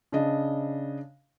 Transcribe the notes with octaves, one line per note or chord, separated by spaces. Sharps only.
C#3 D4 D#5